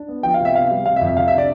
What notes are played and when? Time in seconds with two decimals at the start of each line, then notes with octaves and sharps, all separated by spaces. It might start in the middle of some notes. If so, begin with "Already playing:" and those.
Already playing: D4
0.08 B3
0.23 F3 G5
0.34 F5
0.40 C3
0.45 E5
0.55 B3 F5
0.71 G3
0.85 C3 F5
0.96 E5
1.01 F2
1.07 E5
1.17 C3 F5
1.28 E5
1.32 D4
1.38 D5